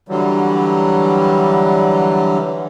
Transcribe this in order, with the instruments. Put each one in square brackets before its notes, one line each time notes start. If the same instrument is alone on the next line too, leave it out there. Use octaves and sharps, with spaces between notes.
[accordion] D3 E3 F#3 G3